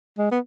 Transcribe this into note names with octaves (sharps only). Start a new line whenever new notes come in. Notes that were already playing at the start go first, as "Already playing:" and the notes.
G#3
B3